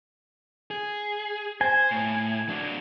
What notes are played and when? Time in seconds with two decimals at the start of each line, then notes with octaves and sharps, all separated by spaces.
0.71 G#4
1.61 C5 G#5
1.91 A2
2.49 F#3 D4